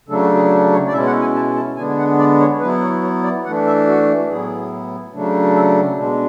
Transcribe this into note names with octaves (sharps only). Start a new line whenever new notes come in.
C#3 F#3 A3 D4 A4
F#4
G#4
C#5
D5
B2 G#3 C#4 E4 E5
F#5
G#5
A5
A5
D3 G#3 B3 D4 G#5
F#5
D5
C#5
F#3 B3 E4 B4
C#5
C#5
D5
E3 A3 D4 F#5
E5
F#4
A2 F#3 B3 E4 G#4
C#3 F#3 A3 D4
A4
B2 G#3 D4